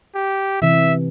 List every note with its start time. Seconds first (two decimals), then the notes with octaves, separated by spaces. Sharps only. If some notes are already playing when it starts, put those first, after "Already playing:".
0.15 G4
0.62 C3 E3 E5